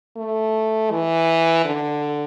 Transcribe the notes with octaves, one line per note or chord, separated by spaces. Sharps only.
A3
E3
D3